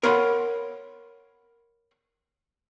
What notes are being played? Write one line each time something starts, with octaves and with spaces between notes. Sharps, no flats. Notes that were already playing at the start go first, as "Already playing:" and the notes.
A#4 C#5 F5 F#5 B5 C6